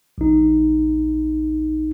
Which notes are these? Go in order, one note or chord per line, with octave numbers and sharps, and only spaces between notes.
A#1 D#4